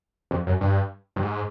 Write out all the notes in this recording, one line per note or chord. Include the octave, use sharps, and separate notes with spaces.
F2
F#2
G2
G2
G#2